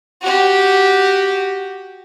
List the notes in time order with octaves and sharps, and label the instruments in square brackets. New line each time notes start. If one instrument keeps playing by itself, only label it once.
[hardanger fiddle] F#4 G4